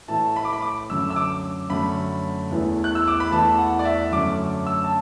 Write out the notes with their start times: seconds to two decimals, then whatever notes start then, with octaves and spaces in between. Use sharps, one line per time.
0.08 A2 E3 A3 A5
0.36 B5
0.45 D6
0.53 B5
0.62 D6
0.90 F#2 D3 A3 E6
1.10 E6
1.16 D6
1.70 F#2 D3 A3 B5
2.51 E2 E3 A3
2.84 F#6
2.95 E6
3.08 D6
3.20 B5
3.31 E2 E3 A3 A5
3.58 F#5
3.79 D5
3.85 E5
4.12 F#2 D3 A3 D6
4.67 E6
4.85 A5